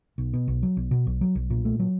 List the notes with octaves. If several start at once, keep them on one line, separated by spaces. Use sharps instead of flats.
B1
B2
B1
F#3
B1
B2
B1
F#3
B1
A#2
A3
F#3